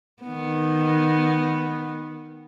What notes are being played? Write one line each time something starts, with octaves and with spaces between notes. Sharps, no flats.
D#3 B3